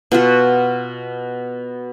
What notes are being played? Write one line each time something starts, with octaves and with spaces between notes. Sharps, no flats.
B2 F4 F#4